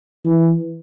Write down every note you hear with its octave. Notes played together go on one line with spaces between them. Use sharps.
E3